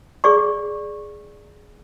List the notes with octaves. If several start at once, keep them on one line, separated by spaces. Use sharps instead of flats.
G#4 D5 C#6